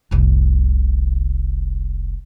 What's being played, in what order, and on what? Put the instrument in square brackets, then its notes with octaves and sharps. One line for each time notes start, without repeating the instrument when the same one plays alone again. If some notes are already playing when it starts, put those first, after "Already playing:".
[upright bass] F1 C2